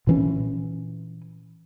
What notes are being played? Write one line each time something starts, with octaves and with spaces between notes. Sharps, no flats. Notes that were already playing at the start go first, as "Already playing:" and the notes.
A#2 E3 C#4